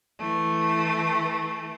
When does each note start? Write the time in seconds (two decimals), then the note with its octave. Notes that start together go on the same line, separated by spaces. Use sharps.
0.18 E3 A3